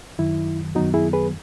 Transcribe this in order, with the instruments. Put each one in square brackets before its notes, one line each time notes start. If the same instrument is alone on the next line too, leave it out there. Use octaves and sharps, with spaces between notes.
[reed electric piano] F#2 D#3 F#3 E4
F#2 D#3 F#3 B3 D#4 F#4
E4 G#4
G#4 B4